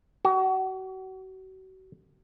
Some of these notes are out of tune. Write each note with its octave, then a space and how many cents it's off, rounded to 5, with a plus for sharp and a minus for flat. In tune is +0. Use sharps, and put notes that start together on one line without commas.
F#4 +35